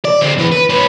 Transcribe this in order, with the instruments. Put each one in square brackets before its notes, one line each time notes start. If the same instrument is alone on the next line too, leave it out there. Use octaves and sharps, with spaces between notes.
[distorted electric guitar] D5
D3 C4
E3 B3
B4
C#4 B4